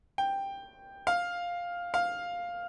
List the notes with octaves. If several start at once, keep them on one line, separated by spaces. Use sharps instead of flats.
G5
F5
F5